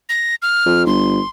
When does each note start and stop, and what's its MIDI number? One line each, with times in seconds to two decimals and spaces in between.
0.09 0.35 94
0.42 0.85 89
0.66 0.86 41
0.86 1.19 31
0.86 1.29 84